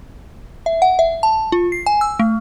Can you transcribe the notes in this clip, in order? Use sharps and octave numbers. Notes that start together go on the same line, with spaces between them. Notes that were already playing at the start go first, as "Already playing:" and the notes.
E5
F#5
E5
A5
F4
C7
G#5
E6
A3